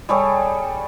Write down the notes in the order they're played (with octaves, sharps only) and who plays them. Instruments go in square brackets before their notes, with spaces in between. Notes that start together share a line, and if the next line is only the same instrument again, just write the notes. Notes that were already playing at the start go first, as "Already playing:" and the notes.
[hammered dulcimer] G3 G#4 A4 C#5